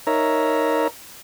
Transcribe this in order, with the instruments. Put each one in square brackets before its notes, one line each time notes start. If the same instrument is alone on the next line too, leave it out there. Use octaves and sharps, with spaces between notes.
[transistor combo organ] D#4 A#4 C#5 E5 A#5